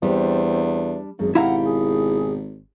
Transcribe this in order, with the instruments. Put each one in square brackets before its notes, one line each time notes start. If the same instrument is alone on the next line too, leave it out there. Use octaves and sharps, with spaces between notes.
[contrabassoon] E2 [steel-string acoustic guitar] G3 D4 [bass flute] C4
[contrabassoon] G#1 [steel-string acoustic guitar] F#2 [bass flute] G#3
[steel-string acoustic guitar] B2 G4 [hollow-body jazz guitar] E4 F5 A#5 [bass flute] F#5
[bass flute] G#4